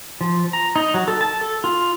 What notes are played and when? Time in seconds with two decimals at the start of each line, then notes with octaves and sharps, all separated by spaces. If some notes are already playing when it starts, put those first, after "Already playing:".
0.21 F3
0.53 A#5
0.76 D#4
0.94 F#3
1.08 A4
1.21 A5
1.41 A4
1.64 F4